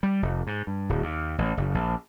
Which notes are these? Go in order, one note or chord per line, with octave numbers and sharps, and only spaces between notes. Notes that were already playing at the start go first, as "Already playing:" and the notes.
G3
F1
G#2
G2
D1
D#2
A1
F#1
A#1